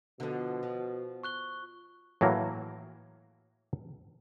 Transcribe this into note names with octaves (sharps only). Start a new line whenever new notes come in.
B2 D3 F3
F3
C#6 F#6 G7
A2 E3 F#3 A3 A#3